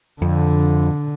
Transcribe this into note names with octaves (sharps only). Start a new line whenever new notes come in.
F2 D3